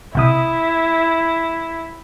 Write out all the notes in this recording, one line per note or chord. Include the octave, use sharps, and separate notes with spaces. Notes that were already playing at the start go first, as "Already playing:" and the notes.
B1 C3 E4 D#6